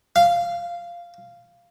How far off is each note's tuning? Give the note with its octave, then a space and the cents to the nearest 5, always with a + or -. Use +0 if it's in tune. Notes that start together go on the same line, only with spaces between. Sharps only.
F5 -10